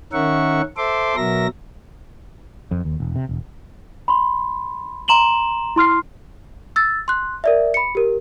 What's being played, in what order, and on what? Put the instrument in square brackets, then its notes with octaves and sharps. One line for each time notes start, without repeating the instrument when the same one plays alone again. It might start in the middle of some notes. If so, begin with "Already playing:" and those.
[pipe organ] D#3 C#4 A#4 E5 F#5 C#6
A4 C5 E5 C6 D6
B2 F#3 A#4 E5 A#6
[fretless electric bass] F2
D#2
E1
C3
E1
[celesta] B5 C6
A#5 C6 E7 F#7 G7
E4 C6 F6 C7
E6 A6
C6 F#6
A#4 D5 E5
B5 C#7
G4 A#4